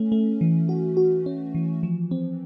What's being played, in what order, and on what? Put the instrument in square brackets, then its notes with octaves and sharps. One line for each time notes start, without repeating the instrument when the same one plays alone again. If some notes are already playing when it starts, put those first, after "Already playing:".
Already playing: [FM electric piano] A3 C#4
A3
E3
F#4
F#4
C#4
E3
F3
C4